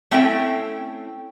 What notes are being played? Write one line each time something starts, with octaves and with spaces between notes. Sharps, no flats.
A3 C4 C#4 E4 A4 G5